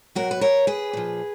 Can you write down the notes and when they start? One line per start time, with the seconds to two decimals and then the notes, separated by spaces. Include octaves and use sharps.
0.15 B2 F#3 F#4 A#4
0.31 B4
0.41 A#4 C#5
0.67 G#4 B4
0.93 A#2 F3